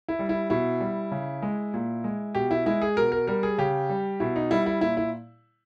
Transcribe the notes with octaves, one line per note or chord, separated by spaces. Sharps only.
E4
G3
E4
B2 E4
G3
C#3
G#3
A#2
G#3
B2 G4
E4
G#3 E4
G#4
B2 A#4
A#4
G3 A#4
G#4
C#3 G4
G3
B2 E4
D#4
G3 E4
E4
A#2 E4
E4